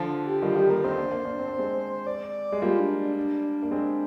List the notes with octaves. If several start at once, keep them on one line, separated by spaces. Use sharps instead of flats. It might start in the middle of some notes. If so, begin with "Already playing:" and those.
Already playing: D3 F3
G4
D#3 G3 F4
D#3 G3 G4
G3 A#3 A#4
C4 D#4 C5
A#3 D4
A#3 D4
A#3 D4
C4
D4
G#3 C4
D5
G#3
G3 A#3 F4
D4
D4
D4
A#3
G#3 C4